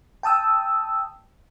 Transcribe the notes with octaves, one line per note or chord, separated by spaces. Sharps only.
G5 A5 D#6 E6